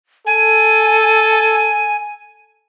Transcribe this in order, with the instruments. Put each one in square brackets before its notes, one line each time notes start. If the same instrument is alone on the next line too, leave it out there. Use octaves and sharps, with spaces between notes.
[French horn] A4 [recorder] G#5